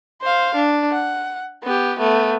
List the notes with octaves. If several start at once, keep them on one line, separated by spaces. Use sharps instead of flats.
C5 F5
D4
F#5
B3 G4
A3 B3